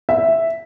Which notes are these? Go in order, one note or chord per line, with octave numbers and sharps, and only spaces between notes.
E5